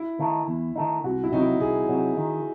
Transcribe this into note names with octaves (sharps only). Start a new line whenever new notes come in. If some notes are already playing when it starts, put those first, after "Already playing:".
Already playing: E4
D#3 A3 D#4
E2
D#3 A3 D#4
C2 F#4
E4
C3 F#3 D#4
E4
C2 G#4
C3 F#3
D#3